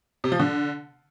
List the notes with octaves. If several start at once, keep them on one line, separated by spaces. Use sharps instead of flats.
C3
F3
D3